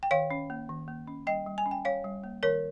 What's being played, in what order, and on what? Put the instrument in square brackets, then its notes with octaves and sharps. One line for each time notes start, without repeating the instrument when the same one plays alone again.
[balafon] G5
D#3 C#5 F5
C#4
A#3
D#3
A#3
C#4
G3 D#5 G5
G3
G#5
C#4
G5
G3 C#5 F5
G3
A#3
D#3 A#4 C#5